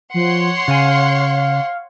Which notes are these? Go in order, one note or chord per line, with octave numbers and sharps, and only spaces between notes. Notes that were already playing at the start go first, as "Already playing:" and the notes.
F3 C#5 F#5 C6
C#3 F5 G#5